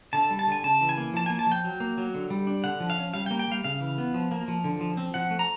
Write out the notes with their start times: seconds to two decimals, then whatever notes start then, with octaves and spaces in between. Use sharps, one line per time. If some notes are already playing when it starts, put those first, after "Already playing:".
0.13 D3 A5
0.31 G3
0.39 A5
0.47 D3 G#5
0.64 C#3 A5
0.81 E3
0.89 G#5
0.98 A#3
1.14 F3 A5
1.26 A#3 G#5
1.39 A5
1.47 F3
1.52 G5
1.64 F#3
1.80 A#3
1.98 F#3
2.15 D3
2.30 G3
2.47 D4
2.64 D3 F#5
2.80 F3
2.90 F5
2.98 C#4
3.14 G3 F5
3.26 G5
3.31 A#3
3.39 G5
3.48 G3 F5
3.64 C#3 F5
3.80 E3
3.98 B3
4.14 F3
4.31 A#3
4.48 F3
4.64 D3
4.81 F3
4.97 C4
5.14 F3 F#5
5.31 A3
5.39 A#5